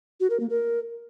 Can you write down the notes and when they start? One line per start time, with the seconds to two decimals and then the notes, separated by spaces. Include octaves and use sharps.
0.20 F#4
0.30 A#4
0.40 A#3
0.50 A#4